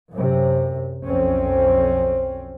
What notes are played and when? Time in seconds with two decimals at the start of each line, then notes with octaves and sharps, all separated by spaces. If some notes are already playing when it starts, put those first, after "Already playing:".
0.12 F#2 C3
1.06 B1 F2 C4 C#4